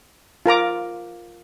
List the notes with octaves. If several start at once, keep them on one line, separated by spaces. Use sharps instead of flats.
F4 A#4 A#5 D6